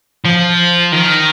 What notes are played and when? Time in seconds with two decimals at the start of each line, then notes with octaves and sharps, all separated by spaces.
0.25 F3
0.92 D#3